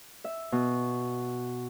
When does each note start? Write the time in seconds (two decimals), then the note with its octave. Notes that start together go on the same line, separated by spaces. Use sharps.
0.24 E5
0.52 B2